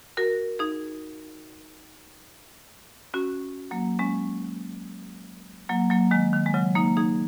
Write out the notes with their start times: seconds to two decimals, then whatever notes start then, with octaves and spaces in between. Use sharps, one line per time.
0.17 F#4 A#4
0.59 D#4 G#4
3.14 C#4 F#4
3.71 F#3 A#3
3.99 G#3 C#4
5.69 F#3 A#3
5.90 F#3 A#3
6.11 D#3 G#3
6.33 D#3
6.46 G#3
6.54 C#3 F#3
6.75 A#3 D#4
6.97 D#4 G#4